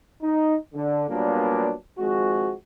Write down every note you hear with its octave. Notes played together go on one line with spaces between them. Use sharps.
D#4
D3
A#2 F#3 G3 A#3 B3 D4
G#1 F3 G#3 C4 F#4